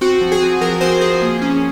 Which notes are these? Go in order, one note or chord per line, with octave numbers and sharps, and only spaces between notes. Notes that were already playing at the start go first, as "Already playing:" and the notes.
C4 F#4
F3
G#4
C4
F3 A#4
C4 C5
F3 G#4
A#3
C#4